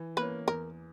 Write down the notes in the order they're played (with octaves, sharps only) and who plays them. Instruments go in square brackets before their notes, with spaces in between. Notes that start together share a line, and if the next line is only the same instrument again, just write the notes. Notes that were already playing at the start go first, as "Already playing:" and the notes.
Already playing: [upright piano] E3
[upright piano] A#3 C#4 [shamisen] B4
[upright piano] E2 [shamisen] A#4